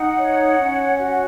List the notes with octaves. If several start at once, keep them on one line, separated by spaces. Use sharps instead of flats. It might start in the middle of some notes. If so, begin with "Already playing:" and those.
Already playing: D#4 F#5
C#5
C#4
F#4